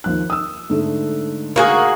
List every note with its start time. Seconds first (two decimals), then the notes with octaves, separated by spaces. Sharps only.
0.04 D#2 F3 F#6
0.30 D#6 E6
0.70 G#2 D3 A3
1.56 A#3 F#4 G#4